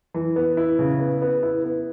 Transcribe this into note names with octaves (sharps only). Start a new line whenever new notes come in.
E3
B3
E4
C#3
B3
B3
E4
B3